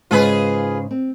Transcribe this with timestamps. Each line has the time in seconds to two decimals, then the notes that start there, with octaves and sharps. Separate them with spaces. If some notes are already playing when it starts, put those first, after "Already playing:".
0.11 G#2 C#3 F4 G#4 B4
0.91 C4